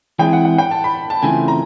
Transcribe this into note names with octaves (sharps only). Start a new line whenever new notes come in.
E3 G#3 C4 E4 G#4 G5
F#5
F#5
G5
A5
B5
A5
C#3 E3 A3 C4 F4 G#5
A#5